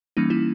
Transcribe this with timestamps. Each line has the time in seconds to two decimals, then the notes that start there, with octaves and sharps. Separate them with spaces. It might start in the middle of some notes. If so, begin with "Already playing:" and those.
0.17 E3 G3 A#3 C#4 D#4
0.30 E4